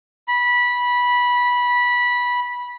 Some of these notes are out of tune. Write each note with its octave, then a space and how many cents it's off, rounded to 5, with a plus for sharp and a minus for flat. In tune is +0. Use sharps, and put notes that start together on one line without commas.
B5 -15